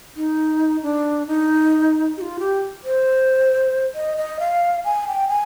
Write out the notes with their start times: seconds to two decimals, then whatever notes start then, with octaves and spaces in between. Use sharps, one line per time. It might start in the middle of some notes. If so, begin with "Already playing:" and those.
0.16 D#4
0.83 D4
1.27 D#4
2.17 G4
2.21 F4
2.39 G4
2.84 C5
3.95 D#5
4.18 D#5
4.40 F5
4.85 G#5
5.08 G5
5.29 G#5